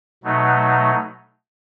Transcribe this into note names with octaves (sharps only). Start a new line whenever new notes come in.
B2 F#3 A3 D#4